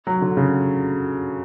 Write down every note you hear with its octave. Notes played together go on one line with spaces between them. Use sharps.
F#3
D3
C#3